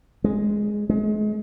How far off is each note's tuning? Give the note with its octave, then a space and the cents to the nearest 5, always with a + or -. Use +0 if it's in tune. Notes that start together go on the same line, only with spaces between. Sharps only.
G#3 +0
G#3 +35